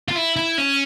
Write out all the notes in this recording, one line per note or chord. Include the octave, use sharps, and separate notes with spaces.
F4
E4
E4
C#4